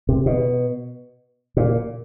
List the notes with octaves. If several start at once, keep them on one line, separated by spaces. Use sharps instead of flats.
C3
B2
A#2